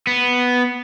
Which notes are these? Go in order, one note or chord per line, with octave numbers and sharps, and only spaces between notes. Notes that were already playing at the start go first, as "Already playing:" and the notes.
B3